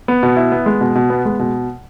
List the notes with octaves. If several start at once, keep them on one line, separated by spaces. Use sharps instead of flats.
B3
B2
E4
B3
G#3
B2
B2
B3
G#3
B2